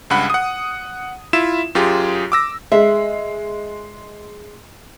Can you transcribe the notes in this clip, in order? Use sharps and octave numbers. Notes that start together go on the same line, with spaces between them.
C#2 G2 F#5 B5
F#5 D#6
E4 F4 E5 E7
F#2 F4 G4 G#4
D6 E6 A#6
G#3 E5